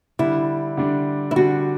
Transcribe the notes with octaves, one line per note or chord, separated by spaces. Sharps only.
D3 G3 D4 E4
D3 G3 D4
E4
D3 G3 D4 F#4